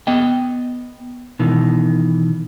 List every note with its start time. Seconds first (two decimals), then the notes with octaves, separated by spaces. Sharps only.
0.07 B3 D#5 G5
1.39 B2 D#3 E3